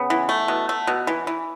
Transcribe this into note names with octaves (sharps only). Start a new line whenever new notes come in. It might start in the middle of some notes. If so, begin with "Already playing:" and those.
Already playing: C#3 B3
E3
A3
B2
A3
B2
E3
E3